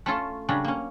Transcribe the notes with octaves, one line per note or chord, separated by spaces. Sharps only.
A3 C#4 F4 A4
C#3 F#3 G3 C#4 D4
A#3 C#4